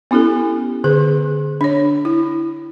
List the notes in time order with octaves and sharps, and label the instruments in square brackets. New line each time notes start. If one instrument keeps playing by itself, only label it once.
[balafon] B3 C#4 E4 G4 A4
D3 G#4 B4
D4 C#5
E4